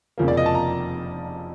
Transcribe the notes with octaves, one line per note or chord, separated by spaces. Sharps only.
F1 F2 C#3 F3 A#3
D5
D#5
A5
A#5